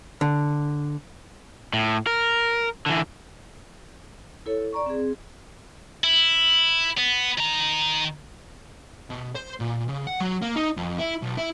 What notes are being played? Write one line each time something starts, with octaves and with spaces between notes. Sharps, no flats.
D3
A2
A#4
D3 E3
E4 A4 C#5
D5 A#5 C#6
C4 G#4
E4
B3
D#3 A#5
B2
C5
A#2
C#3
F#5
F#3
A#3
D#4
F2
E4
B1
E4